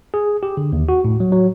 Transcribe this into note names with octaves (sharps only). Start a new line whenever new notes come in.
G#4
G4
D3
D#2
F#4
A2
F#3
F#3